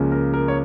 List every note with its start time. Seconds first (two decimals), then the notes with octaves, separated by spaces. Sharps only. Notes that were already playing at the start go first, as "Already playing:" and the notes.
Already playing: C#2 C#3 F3 A#3 C#4
0.12 A#4
0.34 A#4
0.48 C#5